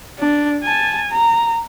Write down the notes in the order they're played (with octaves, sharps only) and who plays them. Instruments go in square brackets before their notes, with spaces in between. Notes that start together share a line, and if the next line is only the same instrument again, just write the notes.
[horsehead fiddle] D4
G#5 A5
A#5